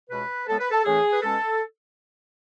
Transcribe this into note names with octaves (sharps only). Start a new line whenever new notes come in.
C#2 B2 G#3 B4
A2 G#3 B3 A4
B4
A4
A2 E3 A3 C#4 G#4
B4
B2 G#3 C#4 A4